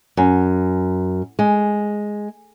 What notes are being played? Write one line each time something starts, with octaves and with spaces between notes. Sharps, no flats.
F#2
G#3